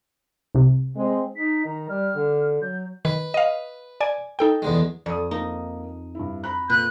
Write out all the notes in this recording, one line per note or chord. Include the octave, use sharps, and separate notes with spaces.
C2 C3
G#3 C4
D#4 B6
D#3 A#5
G3 F6
D3
F#3 G6
D#3 B4
D#5 F5
D5 G#5
D#4 A4 G5
E2 D3 G#3
F2 D5 D#6
A#3 D#4
G2 E4
A#5 B5 F#6
A#2 B4 F#6 G6